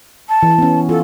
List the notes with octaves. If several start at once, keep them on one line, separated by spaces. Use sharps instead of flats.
A5
E3
B3 C#4
F4 A4